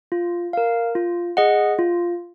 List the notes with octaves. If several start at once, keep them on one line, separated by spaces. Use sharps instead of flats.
F4
A#4 F5
F4
G#4 D#5 F#5
F4